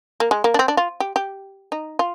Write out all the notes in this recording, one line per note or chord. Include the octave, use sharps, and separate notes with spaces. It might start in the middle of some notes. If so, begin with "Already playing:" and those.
A#3
G#3
A#3
D4
C4
D4
F4
G4
G4
D#4
F4